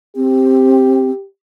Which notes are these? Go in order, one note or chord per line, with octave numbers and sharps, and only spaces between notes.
C4 G4